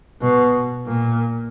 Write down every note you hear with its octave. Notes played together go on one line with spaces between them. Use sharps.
B2
A#2